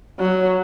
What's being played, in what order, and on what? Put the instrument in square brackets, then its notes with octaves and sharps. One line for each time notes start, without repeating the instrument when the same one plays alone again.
[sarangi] F#3